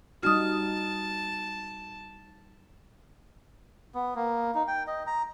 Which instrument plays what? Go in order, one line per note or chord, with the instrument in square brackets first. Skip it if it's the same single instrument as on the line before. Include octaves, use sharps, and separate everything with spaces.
[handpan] G3 D#4 F#4 [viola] A5 [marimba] D#6 F6
[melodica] B3
A#3
D#4
G5
D#5
A#5